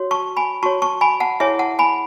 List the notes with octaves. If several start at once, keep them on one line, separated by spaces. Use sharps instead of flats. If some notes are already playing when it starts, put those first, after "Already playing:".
Already playing: F#4 C#5
A5 C#6
G#5 B5
F#4 C#5 A5 C#6
A5 C#6
G#5 B5
F#5 A5
E4 G#4 C#5 E5 G#5
F#5 A5
G#5 B5